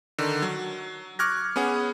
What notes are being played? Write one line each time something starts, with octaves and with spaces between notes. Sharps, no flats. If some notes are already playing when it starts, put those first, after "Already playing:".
D3 D#3
F#3
C#6 D6 F6 F#6 G#6 A#6
B3 C#4 G#4 F#5